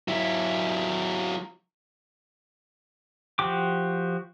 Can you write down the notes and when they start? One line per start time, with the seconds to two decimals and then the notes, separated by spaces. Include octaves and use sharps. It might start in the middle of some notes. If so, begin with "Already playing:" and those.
0.08 F#3 E4
3.39 F3 F#4 G4 D6